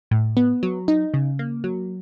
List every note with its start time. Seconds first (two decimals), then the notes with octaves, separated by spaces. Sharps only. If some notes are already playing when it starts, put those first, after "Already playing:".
0.11 A2
0.37 B3
0.63 F#3
0.88 D#4
1.14 C#3
1.39 A#3
1.64 F#3